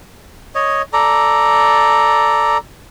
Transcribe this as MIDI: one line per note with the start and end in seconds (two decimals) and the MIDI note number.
0.55 0.82 73
0.55 0.82 75
0.93 2.58 69
0.93 2.58 74
0.93 2.58 82